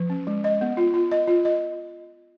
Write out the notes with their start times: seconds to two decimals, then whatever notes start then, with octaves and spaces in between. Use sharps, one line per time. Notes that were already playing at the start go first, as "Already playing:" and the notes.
Already playing: F3
0.10 C#4
0.27 G#3
0.44 D#5
0.61 B3
0.77 F4
0.94 F4
1.12 D#5
1.27 F4
1.45 D#5